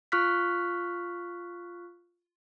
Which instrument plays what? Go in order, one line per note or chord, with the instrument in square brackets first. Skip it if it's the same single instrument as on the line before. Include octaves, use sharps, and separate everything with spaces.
[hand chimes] F4 C#6 F6 F#6 B6